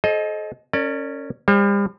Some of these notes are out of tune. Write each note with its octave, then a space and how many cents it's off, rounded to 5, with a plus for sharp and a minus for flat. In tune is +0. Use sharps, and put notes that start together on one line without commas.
A4 -40 C5 +35 D#5 +0
C#4 -5 A#4 -40 D5 +25
G3 +40 C5 +40